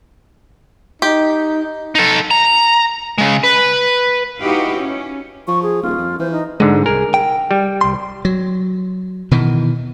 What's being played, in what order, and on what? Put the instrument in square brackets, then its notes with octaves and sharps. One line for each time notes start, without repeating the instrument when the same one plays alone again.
[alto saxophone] D#4 [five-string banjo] G4
[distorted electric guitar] D#4 A4
A#5
C#3 G#3
B4
[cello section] D#4 E4 F#4 G4 B4 F5
C#4
[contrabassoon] F3 [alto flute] C#6
[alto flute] G#4
[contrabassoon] D#1 [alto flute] F4
[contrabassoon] F2
[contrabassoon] E3 [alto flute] C5
[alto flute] D#4
[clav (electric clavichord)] G#2 D3 [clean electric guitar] G#3
[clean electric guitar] C2 G#4 [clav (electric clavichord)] A#4
[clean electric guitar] G5
[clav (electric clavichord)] G3
[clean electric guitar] C2 C6
[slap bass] F#3
B2 D#3 E3